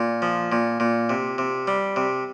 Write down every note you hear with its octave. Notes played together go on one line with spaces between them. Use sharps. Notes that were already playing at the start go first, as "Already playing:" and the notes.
Already playing: A#2
F3
A#2
A#2
C3
C3
G3
C3